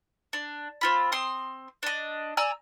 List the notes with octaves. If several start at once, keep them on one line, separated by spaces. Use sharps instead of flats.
D4
C4 F4 B5
C4 C6 D#6
D4 D#5
D5 G#5 A#5 E6